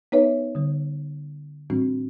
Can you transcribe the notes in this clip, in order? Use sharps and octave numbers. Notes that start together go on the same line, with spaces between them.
B3 D#4 B4 C#5 E5
D3 G3
A2 E3 G3 C4 D4 F#4